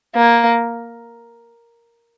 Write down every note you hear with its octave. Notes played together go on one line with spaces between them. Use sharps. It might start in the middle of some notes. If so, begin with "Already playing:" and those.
A#3